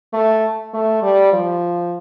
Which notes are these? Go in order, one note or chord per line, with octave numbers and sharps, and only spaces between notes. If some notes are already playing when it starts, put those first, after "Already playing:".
A3
A3
G3
F3